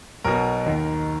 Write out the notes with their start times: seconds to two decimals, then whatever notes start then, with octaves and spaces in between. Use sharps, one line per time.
0.24 B1 B2 A#4
0.66 D#2 D#3